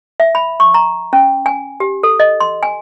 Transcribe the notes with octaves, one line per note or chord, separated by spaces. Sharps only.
E5
B5
C#6
A#5
C#4
G#5
G4
A4
D#5
C6
G#5